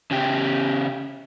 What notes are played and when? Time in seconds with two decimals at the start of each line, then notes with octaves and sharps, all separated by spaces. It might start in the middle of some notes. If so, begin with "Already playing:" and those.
0.11 C#3 G4